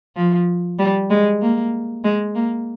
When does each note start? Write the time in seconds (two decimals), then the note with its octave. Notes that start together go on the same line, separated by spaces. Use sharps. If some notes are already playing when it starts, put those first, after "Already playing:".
0.16 F3
0.79 G3
1.10 G#3
1.42 A#3
2.04 G#3
2.35 A#3